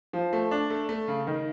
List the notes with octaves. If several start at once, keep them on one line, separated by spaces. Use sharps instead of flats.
F3
A3
D4
A3
A3
C#3
D#3